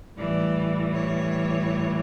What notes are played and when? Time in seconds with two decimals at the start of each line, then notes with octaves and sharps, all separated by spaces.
0.17 A2 E3 G3 D5
0.94 C#5